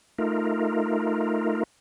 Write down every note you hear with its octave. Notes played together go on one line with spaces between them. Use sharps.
A3 D#4 F4 A#4